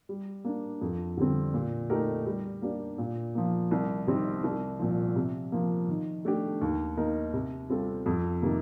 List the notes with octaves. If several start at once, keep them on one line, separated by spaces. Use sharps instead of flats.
G3
A#3 D4
F2
D3 G3 C4
A#2
A3 D#4 G4 A#4
G3
A#3 D4 G4 D5
A#2
F3 A#3
C2
C3 D#3 G3 C4
C2
A#2 F3
C3
F3 A#3
D#3
A3 D4 G4
D#2
D#3 A#3 D#4 A#4
C3
G3 C4 F4 A4
F2
C3 D#3 A#3